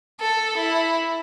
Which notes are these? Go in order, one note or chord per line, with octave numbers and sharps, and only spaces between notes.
A4
E4